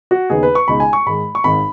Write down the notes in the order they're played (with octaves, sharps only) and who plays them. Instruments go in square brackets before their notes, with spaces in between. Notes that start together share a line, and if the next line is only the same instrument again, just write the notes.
[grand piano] F#4
D#2 C#3 B3 D#4 G#4
B4
C#6
C#2 B2 G#3 D#4 B5
G#5
C#6
G#2 D#3 G#3 B5
C#6
G#1 G#2 D#3 B5